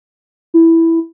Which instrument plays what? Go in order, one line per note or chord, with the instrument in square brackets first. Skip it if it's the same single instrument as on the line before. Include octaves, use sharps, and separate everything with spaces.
[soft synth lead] E4